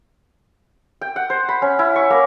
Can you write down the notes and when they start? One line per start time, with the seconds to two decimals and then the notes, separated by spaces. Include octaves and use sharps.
1.01 G5
1.16 F#5
1.30 C5
1.49 B5
1.62 C#4
1.79 E4
1.96 C#6
2.10 A#3